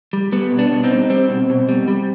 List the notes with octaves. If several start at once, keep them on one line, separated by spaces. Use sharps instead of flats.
G3
G3 B3
B2
B3 D4
B2
C4 D#4
G3
G3 C4
B2
B2
G3
G3